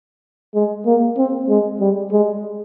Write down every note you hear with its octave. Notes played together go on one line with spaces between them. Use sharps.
G#3
A#3
C4
G#3
G3
G#3